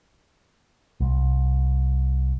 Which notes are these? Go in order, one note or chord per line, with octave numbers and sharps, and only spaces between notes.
C2